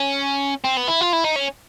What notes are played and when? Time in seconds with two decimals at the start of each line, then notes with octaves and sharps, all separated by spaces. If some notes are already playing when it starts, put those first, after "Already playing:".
Already playing: C#4
0.64 C4
0.77 B3
0.88 E4
1.01 F4
1.13 E4
1.24 D#4
1.36 C#4